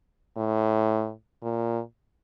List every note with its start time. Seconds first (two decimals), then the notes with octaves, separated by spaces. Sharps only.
0.37 A2
1.43 A#2